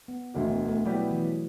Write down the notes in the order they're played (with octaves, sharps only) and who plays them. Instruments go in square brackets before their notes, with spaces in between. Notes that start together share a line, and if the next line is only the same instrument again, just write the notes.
[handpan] B3
[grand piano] E1 D2 D3 F#3
[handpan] B3
A3
[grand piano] B2 G3 B3 E4 G4 [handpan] F#3
[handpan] E3